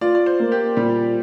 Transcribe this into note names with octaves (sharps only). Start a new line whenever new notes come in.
F4 D5
D5
C5
A#3
G4
A#2 G3